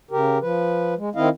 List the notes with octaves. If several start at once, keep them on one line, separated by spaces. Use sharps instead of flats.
C#3 G4 A#4
F3 B4
G#3
D#3 C4 E4 D#5 F5